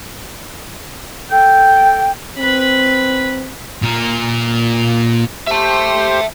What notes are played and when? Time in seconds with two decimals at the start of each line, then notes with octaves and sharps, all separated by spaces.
1.30 A4 G5
2.38 C4 B4 B5
3.82 A#2 A#4
5.47 G4 C5 E5 A5